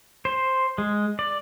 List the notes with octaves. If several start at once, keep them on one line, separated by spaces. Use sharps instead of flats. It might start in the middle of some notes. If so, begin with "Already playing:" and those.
C5
G#3
D5